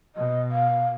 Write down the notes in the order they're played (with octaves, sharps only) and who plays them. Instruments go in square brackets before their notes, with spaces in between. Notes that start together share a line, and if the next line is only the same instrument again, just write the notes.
[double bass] B2 [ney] D#5
[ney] F5